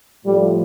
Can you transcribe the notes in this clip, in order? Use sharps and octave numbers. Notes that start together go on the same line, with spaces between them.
A2 F3 G3